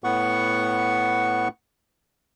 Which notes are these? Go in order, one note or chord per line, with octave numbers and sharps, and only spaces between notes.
A2 B3 F#5 C#6